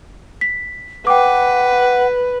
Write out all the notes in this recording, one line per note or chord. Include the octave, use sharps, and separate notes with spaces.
B6
B4 F#5 G5 D6